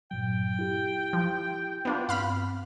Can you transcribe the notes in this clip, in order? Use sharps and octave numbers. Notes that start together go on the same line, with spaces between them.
G2 A#2 F#3 G5
E4 G4
F3
B3 D4 F4
G2 C4 F5 B5 F6